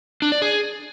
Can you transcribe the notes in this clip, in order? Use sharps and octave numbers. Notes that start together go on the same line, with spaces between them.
D4
D5
G#4